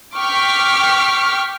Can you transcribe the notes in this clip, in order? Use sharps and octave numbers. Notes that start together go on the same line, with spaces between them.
G5 C#6 D6 F6 B6